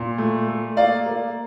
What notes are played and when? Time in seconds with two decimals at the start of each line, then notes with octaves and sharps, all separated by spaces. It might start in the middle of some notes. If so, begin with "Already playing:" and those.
Already playing: A#2
0.18 A3
0.48 A3
0.77 A#3 D5 F5
1.06 A#3